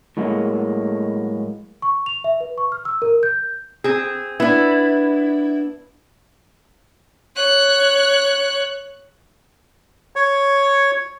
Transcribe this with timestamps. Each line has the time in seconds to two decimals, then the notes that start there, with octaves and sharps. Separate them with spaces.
0.17 A2 F#3 G#3 A#3
1.82 C#6
2.06 F7
2.24 E5
2.40 B4
2.58 C#6
2.72 F6
2.85 E6
3.02 A#4
3.23 G6
3.84 C4 G#4
4.40 B3 D4 E4
7.36 C#5 F#6
10.16 C#5